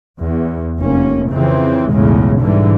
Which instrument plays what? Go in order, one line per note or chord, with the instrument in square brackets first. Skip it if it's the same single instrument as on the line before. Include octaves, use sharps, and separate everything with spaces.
[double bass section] E2
F1 A#3 C#4
F2 C#3 E3 C4
B1 E2 A2 C#3 G#3
G#2 D3 E3 G3